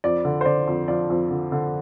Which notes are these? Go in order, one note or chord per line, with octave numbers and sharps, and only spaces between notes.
F2 D5
D3
C5
D3 D5
F2
F3 D5
F2
D3
D3